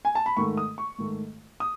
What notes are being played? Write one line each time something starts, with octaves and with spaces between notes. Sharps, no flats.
G#5
A5
B5
G#2 D#3 A3 C#6
D#6
C#6
G#2 D#3 A3
D#6